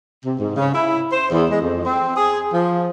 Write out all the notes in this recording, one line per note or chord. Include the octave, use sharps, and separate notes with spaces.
C3
G#2
C#3
E4
C5
E2
G#3
F2
C4
G#4
F3